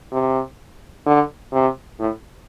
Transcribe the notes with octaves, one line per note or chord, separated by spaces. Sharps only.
C3
D3
C3
A2